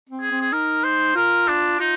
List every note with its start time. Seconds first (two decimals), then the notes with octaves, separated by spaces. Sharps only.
0.10 C4
0.21 G#4
0.31 C4
0.41 G#4
0.52 D#4 A#4
0.84 C5
1.16 F4 A#4
1.48 D4
1.80 D#4 F4